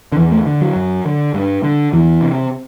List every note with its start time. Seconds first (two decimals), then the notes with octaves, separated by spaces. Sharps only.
0.12 D3
0.17 E2 E3
0.32 A3
0.46 D3
0.61 F#3
0.76 F#2
1.06 D3
1.34 G2
1.63 D3
1.93 E2 E3
2.22 C3